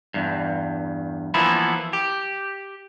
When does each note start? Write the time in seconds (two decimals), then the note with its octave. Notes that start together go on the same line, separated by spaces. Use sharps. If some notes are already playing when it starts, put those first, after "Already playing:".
0.14 E2 G2
1.34 E3 F3 A#3 B3 E4
1.93 G4